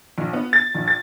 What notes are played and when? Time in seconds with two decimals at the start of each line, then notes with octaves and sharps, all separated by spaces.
0.18 A#1
0.33 B3
0.53 A6
0.75 A#1
0.88 A6